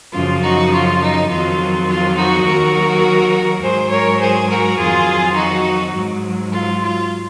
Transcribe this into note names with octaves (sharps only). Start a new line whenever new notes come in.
F#2 C#3 F3 F4
D#4 F#4
F4
D#4
F2 D#3 F#3 F4
F4
D#4 F#4
D#2 D#3 F#3 F#4 A#4
G#2 F#3 G#4 C5
A#4 C#5
G#4 C5
F#4 A#4
F2 D#3 F#3 F4 G#4
D#4 F#4
G#2 F#3
F4
F4